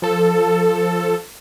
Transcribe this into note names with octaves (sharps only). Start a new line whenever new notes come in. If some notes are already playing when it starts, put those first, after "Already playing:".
F3 A4